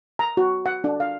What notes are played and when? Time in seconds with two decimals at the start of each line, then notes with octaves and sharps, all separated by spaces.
0.19 A#5
0.37 F#4
0.66 F#5
0.84 D4
1.00 F5